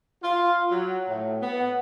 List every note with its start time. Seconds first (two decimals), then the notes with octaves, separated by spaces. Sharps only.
0.23 F4
0.72 F#3
1.10 A2
1.42 B3